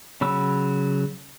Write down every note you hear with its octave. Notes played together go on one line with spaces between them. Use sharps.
C#3 F#3 B5 E6